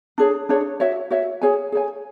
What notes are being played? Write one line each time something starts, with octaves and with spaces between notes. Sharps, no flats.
D4 G#4 C#5
D4 G#4 C#5
F#4 C#5 E5
F#4 C#5 E5
G#4 C#5 G#5
G#4 C#5 G#5